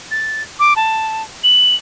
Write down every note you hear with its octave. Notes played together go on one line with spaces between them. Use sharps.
A6
D6
A5
F#7